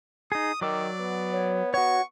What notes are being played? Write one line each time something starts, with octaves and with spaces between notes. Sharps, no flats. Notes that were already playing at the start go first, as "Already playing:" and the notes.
D#4 G#4 D#6
D#3 F#3 D5 D6 E6
B3
C#5
F#4 C#5 F#5 C#6